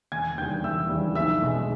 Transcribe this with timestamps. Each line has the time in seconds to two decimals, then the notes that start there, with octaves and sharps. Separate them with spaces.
0.12 E1 G#5 G#6
0.38 D#2 C#3 E3 G3 G5 G6
0.64 E1 E5 E6
0.89 D#2 C#3 E3 G3
1.15 B1 E5 E6
1.41 B2 G#3